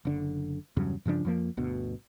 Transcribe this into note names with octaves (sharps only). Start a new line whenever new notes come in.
F#1 D3
E2 G2 C#3 F#3
G2 C#3 F3 D4
F2 F3 A#3
G1 D2 B2